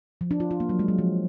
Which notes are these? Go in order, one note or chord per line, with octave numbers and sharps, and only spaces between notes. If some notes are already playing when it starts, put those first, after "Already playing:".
F3
D4
F4
F4
A#3
F#3
G#3
F#3
F3